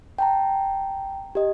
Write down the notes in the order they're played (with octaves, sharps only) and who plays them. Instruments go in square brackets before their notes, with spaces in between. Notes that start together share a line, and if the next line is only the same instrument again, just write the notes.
[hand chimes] G5 A5 A#5
G4 D#5